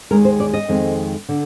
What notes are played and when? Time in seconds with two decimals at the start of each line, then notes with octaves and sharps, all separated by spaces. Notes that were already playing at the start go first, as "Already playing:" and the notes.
0.11 D#2 D#3 G#3 A#4
0.25 C5
0.40 D5
0.54 D#5
0.68 F2 D#3 G#3 C4
1.29 D3